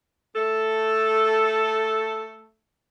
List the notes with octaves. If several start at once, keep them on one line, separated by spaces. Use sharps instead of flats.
A3 A4